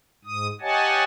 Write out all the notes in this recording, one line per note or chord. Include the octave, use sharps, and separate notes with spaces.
G#2 D#6
G4 C#5 D#5 F#5 G#5 A5